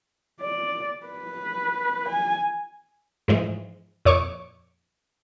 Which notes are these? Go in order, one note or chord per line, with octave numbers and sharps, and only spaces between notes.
D5
B4
G#5
G#2 E3 F3 G#3
F2 A#2 C#5 C#6 D6